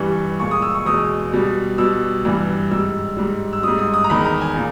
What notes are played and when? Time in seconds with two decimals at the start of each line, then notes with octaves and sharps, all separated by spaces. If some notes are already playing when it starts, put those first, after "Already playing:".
Already playing: G2 E3 G3 C#6
0.39 A#2 G#3 C#6
0.51 D#6
0.62 E6
0.74 C#6
0.86 E2 B2 G#3 D#6
1.32 B2 G3
1.78 B2 G3 E6
2.25 G2 E3 G3
2.71 G#2 G3 E6
3.17 G#2 G3
3.53 E6
3.63 G#2 G3 D#6
3.79 D#6
3.94 D#6
4.04 A#5
4.10 E2 D#3 G#3 B5
4.25 A#5
4.41 G#5
4.56 A#2